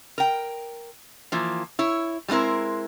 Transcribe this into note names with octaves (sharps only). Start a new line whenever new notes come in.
A#4 G5
E3 F3 A#3
E4 C#5
G3 G#3 C4 E4 A#4